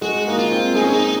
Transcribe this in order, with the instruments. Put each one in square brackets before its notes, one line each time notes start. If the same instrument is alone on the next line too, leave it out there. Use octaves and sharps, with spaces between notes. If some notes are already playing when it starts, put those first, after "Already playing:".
[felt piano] G#3 [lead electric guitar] F#4
[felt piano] A#3 [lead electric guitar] D#4
[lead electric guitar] F4
[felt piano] C4
[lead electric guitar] D#4 [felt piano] G#4
[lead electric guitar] C#4
D#4